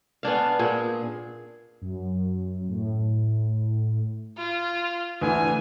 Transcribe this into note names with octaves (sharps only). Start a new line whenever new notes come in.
B3 C#4 D4 F5
A#2 G#4
F#2
A2
F4
D2 E3 G#5